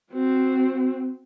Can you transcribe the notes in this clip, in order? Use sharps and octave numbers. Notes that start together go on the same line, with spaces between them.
C4 F#4